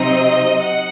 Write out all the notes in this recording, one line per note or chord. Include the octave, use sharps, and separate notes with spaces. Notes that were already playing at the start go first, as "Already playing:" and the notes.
Already playing: C3 F#3 C4 D#4 D#5
F#5